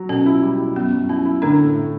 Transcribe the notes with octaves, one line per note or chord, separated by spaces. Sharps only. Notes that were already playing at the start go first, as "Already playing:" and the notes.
Already playing: F#3
B2 C#4
E4
G3
E4
F#2 B3
F#2
C#4 E4
E4
A2 D3 D4
A3
A2